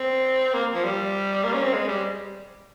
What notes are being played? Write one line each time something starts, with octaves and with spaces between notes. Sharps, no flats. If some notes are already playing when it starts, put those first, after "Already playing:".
Already playing: C4
A#3
F3
G3
A#3
C#4
C4
G#3
G3